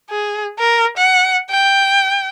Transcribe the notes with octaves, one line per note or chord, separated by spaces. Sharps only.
G#4
A#4
F#5
G5